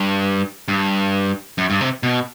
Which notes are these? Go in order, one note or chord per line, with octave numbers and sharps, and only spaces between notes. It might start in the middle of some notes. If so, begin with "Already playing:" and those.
Already playing: G2
G2
F#2
G2
C3
B2